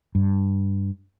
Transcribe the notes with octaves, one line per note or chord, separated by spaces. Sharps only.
G2